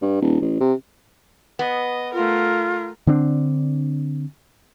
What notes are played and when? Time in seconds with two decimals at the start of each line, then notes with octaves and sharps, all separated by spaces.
0.02 G2
0.22 D#1
0.41 A1
0.61 C3
1.59 B3 D#5
2.14 A3 F4 A#4
3.07 D3 C4 D4